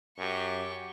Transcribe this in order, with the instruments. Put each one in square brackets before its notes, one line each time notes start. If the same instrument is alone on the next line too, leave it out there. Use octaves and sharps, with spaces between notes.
[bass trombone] F#2 [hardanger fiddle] G4 C#6